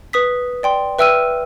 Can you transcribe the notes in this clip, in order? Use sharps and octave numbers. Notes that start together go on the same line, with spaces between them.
B4 D#6 B6
D5 G5 C6
B4 E5 G5 E6 F6 D#7